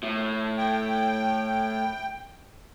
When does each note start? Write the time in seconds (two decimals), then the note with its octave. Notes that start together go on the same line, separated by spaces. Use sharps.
0.03 A2
0.58 G5